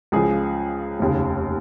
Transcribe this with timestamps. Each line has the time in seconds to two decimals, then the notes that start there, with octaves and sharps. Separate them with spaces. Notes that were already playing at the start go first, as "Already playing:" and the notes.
0.12 C#2 C#3 F3 G#4
0.99 F1 D#2 C#3